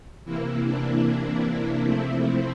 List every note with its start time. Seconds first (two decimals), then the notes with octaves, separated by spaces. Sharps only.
0.25 C3 E3 A#3 E4
0.64 D4
1.43 D4
1.84 C3 F3 A3 C4 E4